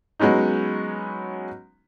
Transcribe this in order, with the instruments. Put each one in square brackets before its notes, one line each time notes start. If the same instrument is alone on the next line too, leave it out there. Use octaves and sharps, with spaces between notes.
[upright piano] F#3 G#3 B3 C#4 D#4